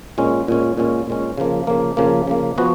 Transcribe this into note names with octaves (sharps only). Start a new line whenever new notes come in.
A#2 G#3 C#4
A#2 G#3 C#4
A#2 G#3 C#4
A#2 G#3 C#4
C#3 F3 A#3
C#3 F3 A#3
C#3 F3 A#3
C#3 F3 A#3
F3 B3 F#4